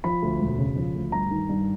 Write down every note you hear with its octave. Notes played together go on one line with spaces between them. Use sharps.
F3 B5
D2
E1
C#3
F3
D2
G2 A#5
D#3
G2